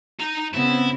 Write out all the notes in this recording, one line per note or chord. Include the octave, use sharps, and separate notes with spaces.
D#4 A#5
C#3 B3 C4 E4